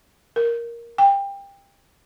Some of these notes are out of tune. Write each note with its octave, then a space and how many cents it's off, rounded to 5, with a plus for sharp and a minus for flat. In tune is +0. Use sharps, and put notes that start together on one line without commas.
A#4 +5
G5 +20